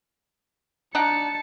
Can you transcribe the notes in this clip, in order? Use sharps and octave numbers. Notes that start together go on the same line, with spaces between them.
D4 D#4 F#5 A5 C#7